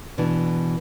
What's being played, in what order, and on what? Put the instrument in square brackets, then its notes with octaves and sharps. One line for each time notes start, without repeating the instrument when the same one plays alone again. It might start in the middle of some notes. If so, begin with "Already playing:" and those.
[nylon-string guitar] B2 E3 D4